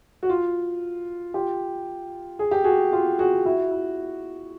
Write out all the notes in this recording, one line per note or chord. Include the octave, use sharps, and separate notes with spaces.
F#4
F4
F4 G4
G#4
G4
F#4 G#4
F4 G4
F#4 G#4
E4 F#4
E4